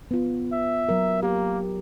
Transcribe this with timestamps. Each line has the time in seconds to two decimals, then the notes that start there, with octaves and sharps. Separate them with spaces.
0.11 B3 F4
0.53 E5
0.89 F#3 A#4
1.23 A#3 G4